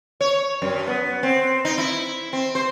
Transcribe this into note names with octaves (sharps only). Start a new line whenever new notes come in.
C#5
F#2
B3
C4
D#4
E4
C4
C5